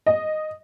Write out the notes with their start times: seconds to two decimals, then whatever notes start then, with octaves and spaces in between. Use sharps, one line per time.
0.06 D#5